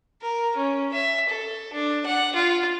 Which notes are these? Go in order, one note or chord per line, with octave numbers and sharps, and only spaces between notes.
A#4
C#4
E5
A4
D4
F#5
F4